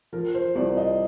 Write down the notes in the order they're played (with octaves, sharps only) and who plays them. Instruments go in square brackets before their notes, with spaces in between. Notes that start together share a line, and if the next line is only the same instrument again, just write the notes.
[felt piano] F3 A#4
C5
C2 D5
D#5